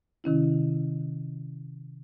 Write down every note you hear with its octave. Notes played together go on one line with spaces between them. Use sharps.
C3 D#3 C#4 E4